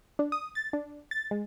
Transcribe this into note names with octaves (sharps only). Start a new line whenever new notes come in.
D4
D#6
A6
D4
A6
G#3